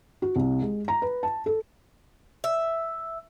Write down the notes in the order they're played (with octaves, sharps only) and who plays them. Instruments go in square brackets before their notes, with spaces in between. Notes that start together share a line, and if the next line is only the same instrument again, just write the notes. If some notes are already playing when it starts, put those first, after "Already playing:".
[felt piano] F#4
C2
G#3
A#5
B4
A5
A4
[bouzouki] E5